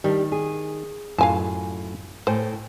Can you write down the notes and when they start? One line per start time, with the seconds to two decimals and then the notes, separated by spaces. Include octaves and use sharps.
0.04 D#3 G3 D4
0.32 G#4
1.18 F#2 A2 F4 F5 G#5 A5
2.27 A2 C5 G5 G#5